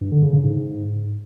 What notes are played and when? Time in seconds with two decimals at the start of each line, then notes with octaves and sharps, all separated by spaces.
0.01 G2
0.12 D3
0.22 C#3
0.33 C#3
0.43 G#2